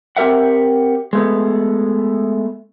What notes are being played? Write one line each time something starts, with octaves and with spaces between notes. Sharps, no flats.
C4 G4 A#4 E5 F#5
G#3 A3 B3